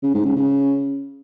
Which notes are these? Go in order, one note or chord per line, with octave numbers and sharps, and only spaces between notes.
C#3
G#2
C#3
C#3